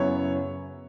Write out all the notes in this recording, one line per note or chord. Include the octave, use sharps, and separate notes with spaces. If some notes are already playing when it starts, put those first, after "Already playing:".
Already playing: F#2 C#3 F#3 B3 E4 C#5